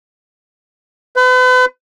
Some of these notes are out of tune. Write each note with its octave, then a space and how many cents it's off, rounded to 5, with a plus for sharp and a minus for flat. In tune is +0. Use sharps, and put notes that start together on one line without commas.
B4 +40